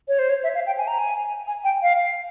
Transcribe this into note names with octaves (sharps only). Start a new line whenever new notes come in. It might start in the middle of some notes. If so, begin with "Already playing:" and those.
C#5
C5
C#5
E5
F5
G5
G#5
A#5
G#5
G#5
G5
F5